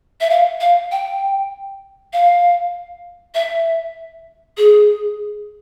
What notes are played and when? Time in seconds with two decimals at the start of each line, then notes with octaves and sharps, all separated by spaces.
0.21 E5
0.30 F5
0.60 F5
0.92 G5
2.13 F5
3.35 E5
4.57 G#4